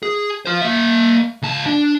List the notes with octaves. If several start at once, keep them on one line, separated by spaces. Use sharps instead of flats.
G#4
F4 C5
A#3 E5
C#2 A5
D4